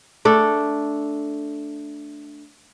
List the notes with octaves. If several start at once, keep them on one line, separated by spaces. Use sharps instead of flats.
A3 D4 A4